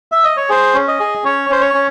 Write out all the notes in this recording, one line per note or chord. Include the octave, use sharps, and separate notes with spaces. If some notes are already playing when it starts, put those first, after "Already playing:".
E5
D#5
C#5
G#4 C5
C#4
D#5
G#4
C#4 C#5
C#4 C5
C#5
C#4